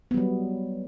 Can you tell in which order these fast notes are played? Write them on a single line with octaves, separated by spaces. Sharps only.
B3 G3 F#3